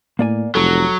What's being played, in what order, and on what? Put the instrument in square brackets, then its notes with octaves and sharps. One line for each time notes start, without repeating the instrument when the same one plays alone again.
[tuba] A2 [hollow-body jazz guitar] A#3 D5 G#5
[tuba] F1 [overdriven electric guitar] F#3 [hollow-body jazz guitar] A4